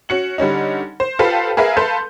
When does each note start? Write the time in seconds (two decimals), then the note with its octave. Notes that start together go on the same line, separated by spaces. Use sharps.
0.09 C#4 F#4 C#7 F#7
0.38 D3 G3 C#4 D#4
1.00 C5
1.19 F4 G4 A4 B4 C5 F5
1.57 G#4 A#4 B4 E5 F5
1.77 A4 B4 F5 B5 C6 G6